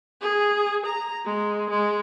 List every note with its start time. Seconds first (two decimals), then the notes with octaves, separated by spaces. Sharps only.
0.21 G#4
0.86 A#5
1.25 G#3
1.70 G#3